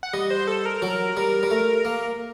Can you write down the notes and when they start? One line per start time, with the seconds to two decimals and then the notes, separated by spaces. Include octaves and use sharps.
0.03 F#5
0.14 G3 D#5
0.30 C5
0.47 A4
0.65 A#4
0.82 F#3
1.17 G3
1.43 G3
1.50 A3
1.85 A#3